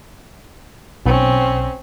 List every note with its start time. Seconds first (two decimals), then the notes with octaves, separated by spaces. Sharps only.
1.06 B1 C4 C#4